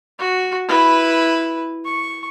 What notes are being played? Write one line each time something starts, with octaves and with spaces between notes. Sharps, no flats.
F#4
E4 B4
C#6